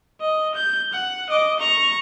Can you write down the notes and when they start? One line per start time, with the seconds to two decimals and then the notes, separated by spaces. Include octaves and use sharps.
0.20 D#5
0.55 G6
0.93 F#5
1.30 D#5 D6
1.59 A#5 C#6